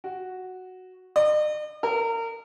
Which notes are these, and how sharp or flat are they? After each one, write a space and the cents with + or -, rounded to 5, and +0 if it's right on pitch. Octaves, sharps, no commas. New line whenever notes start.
F#4 +0
D#5 -45
A#4 -30